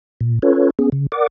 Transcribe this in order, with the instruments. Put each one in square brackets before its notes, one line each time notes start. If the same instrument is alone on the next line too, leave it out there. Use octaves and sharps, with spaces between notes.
[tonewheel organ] A#2
C#4 F4 A4 B4 C#5
B3 C#4 G#4
C#3
A#4 D5 F#5 D6